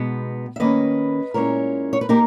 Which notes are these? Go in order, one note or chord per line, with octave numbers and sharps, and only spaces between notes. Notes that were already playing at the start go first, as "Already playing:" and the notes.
Already playing: B2 G#3 B3 D#4
E5
D#3 A#3 C#4 B4 D#5
A#2 G#3 C#4 E4 A#4 C#5
C#5
B4
A#3 D#4 G4 A#4